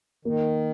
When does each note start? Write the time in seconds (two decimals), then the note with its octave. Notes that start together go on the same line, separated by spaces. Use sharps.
0.25 D#3 A#3